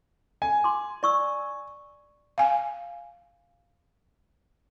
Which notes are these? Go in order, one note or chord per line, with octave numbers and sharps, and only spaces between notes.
G#5
C6 D6
D5 C#6 E6
F5 G#5